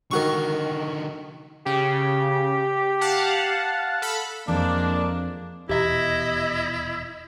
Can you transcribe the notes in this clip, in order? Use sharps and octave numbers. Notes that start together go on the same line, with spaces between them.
D3 D#3 D#4 F#4 C#6
C#3 G4
F5 F#5 A5
A4 B5
F2 G#3 A#3 D4
D#1 E2 B2 E4 G4 D#5 E5